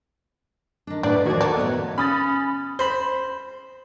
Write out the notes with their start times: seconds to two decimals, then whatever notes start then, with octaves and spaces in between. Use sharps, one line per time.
0.87 D#3 D4
1.03 A2 D4 B4 D5
1.26 D#2 D#3 F3 F#4 G#6
1.41 A#3 A4 D5
1.57 A2 B3
1.98 C#4 B5 D#6 A6
2.79 C5 B5